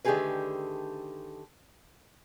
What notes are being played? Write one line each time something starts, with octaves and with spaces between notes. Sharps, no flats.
D3 D#3 A3 G4 G#4 B4